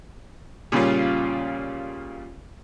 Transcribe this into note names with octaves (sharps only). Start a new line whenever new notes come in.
A#2 C#3 G3 C#4 F4